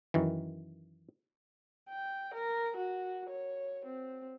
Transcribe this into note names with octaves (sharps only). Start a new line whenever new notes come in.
F#2 D#3 E3
G5
A#4
F#4
C#5
C4